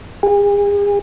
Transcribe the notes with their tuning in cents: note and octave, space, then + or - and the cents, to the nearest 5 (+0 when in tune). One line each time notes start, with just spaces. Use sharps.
G#4 -40